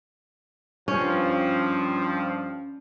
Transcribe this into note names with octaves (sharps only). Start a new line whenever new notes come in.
G2 F3 C#4